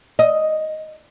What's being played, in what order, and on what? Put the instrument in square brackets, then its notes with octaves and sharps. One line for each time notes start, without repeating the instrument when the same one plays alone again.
[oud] D#5